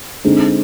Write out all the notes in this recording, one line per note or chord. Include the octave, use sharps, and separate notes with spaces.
D3 G#3 C4 D#4